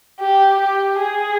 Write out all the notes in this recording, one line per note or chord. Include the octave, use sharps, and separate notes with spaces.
G4
G4
G#4